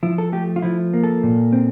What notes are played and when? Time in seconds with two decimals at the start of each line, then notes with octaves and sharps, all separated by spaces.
0.03 F3 E4
0.18 A4
0.32 A3 G4
0.56 F4
0.62 F3 E4
0.94 A#3
1.04 A4
1.23 A#2
1.53 C4